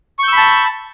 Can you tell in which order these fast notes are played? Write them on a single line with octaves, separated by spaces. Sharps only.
C#6 G6 E6 B5 A5